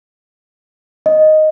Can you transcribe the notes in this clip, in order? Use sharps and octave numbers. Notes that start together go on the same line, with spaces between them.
D#5